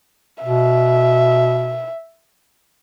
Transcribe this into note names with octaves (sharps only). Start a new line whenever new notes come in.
B2 E5